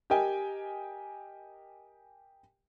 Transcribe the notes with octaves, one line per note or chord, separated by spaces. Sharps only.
G4 A#4 D#5 G5 G#5